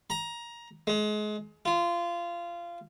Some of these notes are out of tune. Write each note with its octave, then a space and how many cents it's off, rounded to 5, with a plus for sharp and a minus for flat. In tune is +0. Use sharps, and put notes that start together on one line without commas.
A#5 +15
G#3 +30
F4 -20